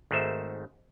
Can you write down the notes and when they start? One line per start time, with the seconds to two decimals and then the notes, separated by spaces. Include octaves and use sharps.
0.11 G#1 G#2 D#3 A3 C5 E5